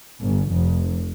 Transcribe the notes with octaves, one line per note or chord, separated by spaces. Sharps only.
G1
F1